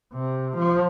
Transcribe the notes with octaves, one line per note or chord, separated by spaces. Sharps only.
C3
F3